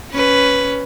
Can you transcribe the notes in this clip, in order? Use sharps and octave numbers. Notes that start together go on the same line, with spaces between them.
C#4 B4